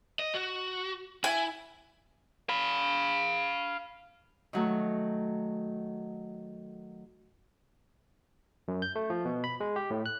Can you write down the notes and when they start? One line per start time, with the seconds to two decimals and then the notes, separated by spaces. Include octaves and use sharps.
0.19 D#5
0.34 F#4
1.24 E4 G#5
2.49 F5 B5
4.53 D#3 F#3 A3
8.68 F#2
8.82 G6
8.95 A3
9.10 F3
9.25 B2
9.44 B5
9.60 G#3
9.76 G4
9.90 A2
10.06 F#6